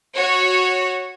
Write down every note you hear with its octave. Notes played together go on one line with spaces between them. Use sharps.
F#4 C#5